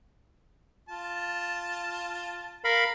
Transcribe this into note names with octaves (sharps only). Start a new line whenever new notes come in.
F4 A5
A#4 F5 B5